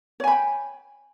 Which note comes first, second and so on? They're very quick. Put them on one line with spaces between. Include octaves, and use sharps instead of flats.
C#5 G#5 B5 G5